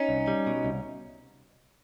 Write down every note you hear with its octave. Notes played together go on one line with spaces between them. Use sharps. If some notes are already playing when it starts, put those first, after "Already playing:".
Already playing: C#4 D#4
C2
G3
B2
C2